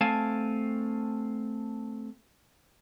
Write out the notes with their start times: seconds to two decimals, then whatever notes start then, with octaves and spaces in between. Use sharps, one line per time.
0.01 A3 C4 F5 G#5 A5